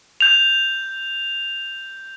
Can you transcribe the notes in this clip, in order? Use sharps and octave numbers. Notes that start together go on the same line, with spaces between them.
G6 F7